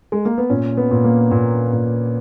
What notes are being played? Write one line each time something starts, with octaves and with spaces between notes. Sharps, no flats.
G#3
A#3
B3
A#2 C#4
B3
A#2
A#3
A#2
A#2